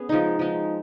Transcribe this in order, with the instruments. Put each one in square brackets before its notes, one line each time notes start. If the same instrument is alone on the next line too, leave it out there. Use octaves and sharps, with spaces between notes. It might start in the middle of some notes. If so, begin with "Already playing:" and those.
Already playing: [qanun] B3 C#4 G#4
F3 G#3 D#4
F3 G#3 D#4